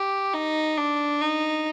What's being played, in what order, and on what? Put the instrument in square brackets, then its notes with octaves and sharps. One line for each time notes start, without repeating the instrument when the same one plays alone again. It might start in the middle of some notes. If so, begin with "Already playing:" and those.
Already playing: [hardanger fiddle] G4
D#4
D4
D#4